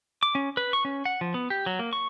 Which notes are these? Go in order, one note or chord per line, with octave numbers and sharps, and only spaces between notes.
D6
C#4
B4
C#6
C#4
F#5
F3
B3
G4
F#3
A#3
C#6